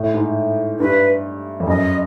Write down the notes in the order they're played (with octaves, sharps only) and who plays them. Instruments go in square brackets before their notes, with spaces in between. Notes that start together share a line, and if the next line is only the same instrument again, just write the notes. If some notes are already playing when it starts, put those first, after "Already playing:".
Already playing: [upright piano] A2
G#2
[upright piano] G2 [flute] B4
[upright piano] F2
[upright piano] F#2 [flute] D#5